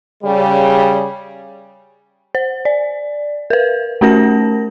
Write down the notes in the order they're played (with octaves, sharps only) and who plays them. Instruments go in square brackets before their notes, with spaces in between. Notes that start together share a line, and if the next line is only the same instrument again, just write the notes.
[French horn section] C#3 G3
[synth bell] C5
D5
A#4 B4
A3 C#4 F#4 A#4 A5 A#6